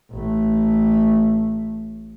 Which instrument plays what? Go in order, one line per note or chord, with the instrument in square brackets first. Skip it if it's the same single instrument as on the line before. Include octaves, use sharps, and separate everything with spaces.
[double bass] A1 A3